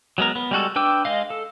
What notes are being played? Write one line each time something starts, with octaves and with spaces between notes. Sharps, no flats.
F#3 G#3 B3 A#4
B3
G3 G#3 F#4 A4
D4 B4 G5 D6 E6
G#3 D#5 F5
A4